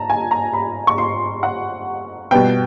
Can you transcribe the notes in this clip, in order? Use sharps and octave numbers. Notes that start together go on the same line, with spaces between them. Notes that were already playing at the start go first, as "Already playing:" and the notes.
Already playing: A5 A#5
G#5
A#5
B5
C#6
C6
F#5
B2 G3 B3 G5